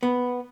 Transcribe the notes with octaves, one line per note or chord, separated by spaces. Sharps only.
B3